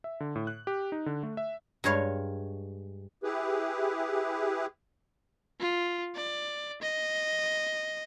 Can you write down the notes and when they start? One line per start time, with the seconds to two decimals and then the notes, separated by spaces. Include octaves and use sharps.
0.04 E5
0.20 D3
0.36 A2
0.47 F#6
0.67 G4
0.92 D#4
1.06 D3
1.23 A3
1.37 E5
1.84 G2 G#3 C#5 F5
3.24 E4 G4 G#4 B4
5.60 F4
6.15 D5
6.82 D#5